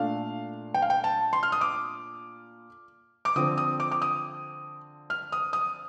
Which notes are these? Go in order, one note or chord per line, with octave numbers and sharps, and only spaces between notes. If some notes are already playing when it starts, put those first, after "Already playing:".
Already playing: A#2 A3 D4 F5
G5
F5
G5
A5
C6
F6
D#6
D6
D6
D3 F3 C4 D#6
D#6
D6
D6
D#6
F6
D#6
D#6